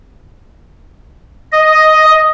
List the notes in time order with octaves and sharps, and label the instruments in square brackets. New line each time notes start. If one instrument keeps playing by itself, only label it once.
[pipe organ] D#5